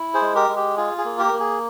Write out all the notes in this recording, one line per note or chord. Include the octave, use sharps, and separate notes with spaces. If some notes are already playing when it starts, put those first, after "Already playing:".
Already playing: E4
G#4 C5
G#3
G4 A#4
G#3
G4
F4 G#4
G#4
A#3
G4 A#4
A#3
G#4